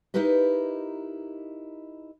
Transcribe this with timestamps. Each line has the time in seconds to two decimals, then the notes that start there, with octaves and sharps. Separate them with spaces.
0.14 D#4 E4 G4 A#4 B4 D#5